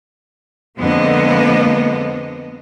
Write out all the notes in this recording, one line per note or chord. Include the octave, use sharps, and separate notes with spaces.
F2 D3 G#3 A#3 B3 D#5